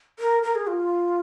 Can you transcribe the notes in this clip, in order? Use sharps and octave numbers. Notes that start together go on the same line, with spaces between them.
A#4
A#4
G#4
F4